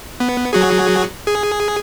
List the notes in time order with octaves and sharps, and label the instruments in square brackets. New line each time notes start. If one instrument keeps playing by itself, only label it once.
[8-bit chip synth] B3
F#3 F#4 G#4
G#4